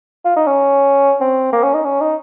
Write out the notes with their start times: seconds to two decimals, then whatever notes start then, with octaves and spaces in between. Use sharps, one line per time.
0.25 F4
0.36 D#4
0.47 C#4
1.21 C4
1.53 A#3
1.63 C#4
1.74 D#4
1.85 C#4
2.01 D#4